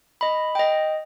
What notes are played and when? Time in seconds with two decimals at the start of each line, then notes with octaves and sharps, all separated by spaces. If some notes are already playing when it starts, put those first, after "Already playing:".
0.21 D#5 B5
0.55 D#5 G5